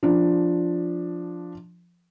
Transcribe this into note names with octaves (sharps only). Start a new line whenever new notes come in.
F3 D4